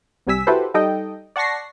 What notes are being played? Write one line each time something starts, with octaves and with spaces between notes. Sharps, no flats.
C2 C3 G3 G#5 E6 B6
E4 F#4 G4 A4 B4 C5
G3 D#4 A4 D#5 G5
D5 F#5 A5 C#6 A#6 C7